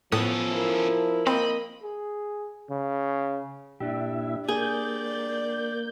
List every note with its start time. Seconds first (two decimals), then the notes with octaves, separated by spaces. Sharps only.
0.12 A2 F3 B3 C#4 A4 D#6
0.50 E4 A#4
1.27 A#3 C4 D#5 B5
1.83 G#4
2.70 C#3
3.80 A#2 D4 E4 G4 E5
4.49 A#3 G#4 D5 G6